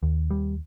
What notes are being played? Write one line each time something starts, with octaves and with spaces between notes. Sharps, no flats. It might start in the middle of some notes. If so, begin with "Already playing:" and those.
D#2
G3